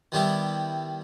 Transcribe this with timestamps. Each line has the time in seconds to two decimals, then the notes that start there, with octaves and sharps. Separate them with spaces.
0.12 D#3 G3 B3 E4 G4